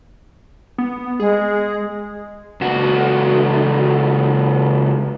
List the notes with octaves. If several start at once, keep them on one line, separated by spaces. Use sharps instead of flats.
B3
G#3 G#4
C#2 F#4